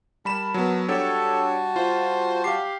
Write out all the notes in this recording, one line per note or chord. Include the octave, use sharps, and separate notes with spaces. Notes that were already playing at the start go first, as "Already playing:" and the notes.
G3 A#4 A5 B5 E7
F#3 B3
G3 D4 F#4 G4 A4 C#5 A5
F4 C5
G4 F5 C7